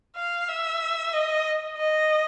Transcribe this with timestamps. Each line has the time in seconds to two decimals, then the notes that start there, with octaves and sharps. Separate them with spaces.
0.16 F5
0.49 E5
1.13 D#5
1.78 D#5